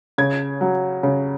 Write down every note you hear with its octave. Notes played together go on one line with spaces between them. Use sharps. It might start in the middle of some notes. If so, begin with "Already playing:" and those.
C#3 G#6
F#3
C#3